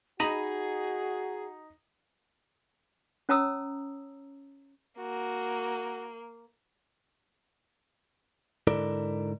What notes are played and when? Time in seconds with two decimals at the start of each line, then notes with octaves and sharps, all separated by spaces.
0.20 D#4 F#4 G#4 D#5 A#5 B5
3.29 C#4 C#5 A5 A#5 D#6 E6
4.99 A#3 F#4
8.67 G#2 D3 E4 A4 A#4 D5